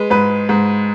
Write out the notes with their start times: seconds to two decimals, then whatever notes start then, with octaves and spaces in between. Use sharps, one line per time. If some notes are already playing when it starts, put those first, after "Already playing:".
Already playing: G#3 B4
0.10 G#2 B4
0.49 G#2